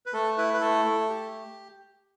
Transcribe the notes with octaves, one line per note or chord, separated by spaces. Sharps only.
B4
A3 A4
E4 B4
B4
A3 A4
A3
G4